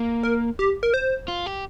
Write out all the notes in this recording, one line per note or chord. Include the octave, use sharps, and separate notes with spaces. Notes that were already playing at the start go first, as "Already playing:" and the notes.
Already playing: A#3
A#4
G4
A#4
C5
F4
G4